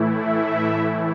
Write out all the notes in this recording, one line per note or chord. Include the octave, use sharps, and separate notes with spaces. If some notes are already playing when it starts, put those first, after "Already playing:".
Already playing: A2 E3 A3 E4
E5